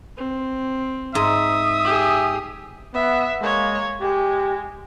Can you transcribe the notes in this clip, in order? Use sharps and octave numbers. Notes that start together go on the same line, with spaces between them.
C4
G#2 E5 D#6
G4 G#4
B3 E5 F#5
G#3 A#3 C#5
G#3 G4